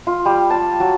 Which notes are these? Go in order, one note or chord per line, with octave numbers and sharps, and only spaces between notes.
F4
G3
A5
F#3